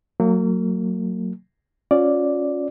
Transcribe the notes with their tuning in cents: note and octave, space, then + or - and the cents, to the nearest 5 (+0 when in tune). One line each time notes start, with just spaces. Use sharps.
F#3 +0 A#3 -35
C#4 +0 F4 +35 D5 +0